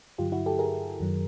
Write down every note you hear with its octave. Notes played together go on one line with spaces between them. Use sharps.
G2 D3 F#3 F4 G4
E4 F#4
G4 A4
G#4 A#4
F#2 D#3 F#3